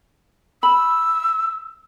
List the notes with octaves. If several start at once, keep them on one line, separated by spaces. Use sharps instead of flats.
B5 E6